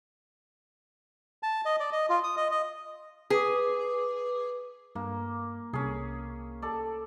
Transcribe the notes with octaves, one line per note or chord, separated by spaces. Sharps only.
A5
D#5
D5
D#5
F4
D#6
D#5
D#5
G#4 B4 D6
G2 A#3
C2 C#4 G#4
A4 D5